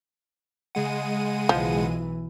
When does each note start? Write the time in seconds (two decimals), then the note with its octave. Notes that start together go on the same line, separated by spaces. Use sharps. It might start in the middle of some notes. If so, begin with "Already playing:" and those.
0.75 C#3 G#3 F#5 D#7
1.49 B1 E3 F3